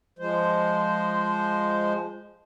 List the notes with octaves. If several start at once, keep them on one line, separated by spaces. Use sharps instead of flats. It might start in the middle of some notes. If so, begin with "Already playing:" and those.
F3 G#3 C5